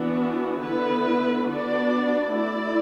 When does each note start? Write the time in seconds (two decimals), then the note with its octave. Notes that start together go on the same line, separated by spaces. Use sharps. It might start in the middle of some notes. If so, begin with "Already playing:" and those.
Already playing: E3 B3 D4 F#4
0.60 D3 B3 E4 B4
1.45 B3 D4 F#4 D5
2.30 A3 E4 D5